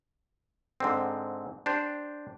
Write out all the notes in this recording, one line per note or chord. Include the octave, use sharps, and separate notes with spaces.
G#2 D3 C4
D4 G4 C5